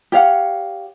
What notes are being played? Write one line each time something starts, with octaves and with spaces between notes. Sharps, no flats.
G4 C#5 F5 F#5